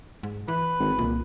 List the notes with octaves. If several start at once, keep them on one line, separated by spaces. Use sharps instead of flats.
G#2
E3 B4
G#1
C2 A#2